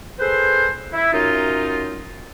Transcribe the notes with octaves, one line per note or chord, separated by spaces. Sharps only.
G#4 A4 B4 C5
E4
F#2 D#4 F4